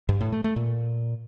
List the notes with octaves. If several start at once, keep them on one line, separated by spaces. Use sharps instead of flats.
G2
A2
A3
A3
A#2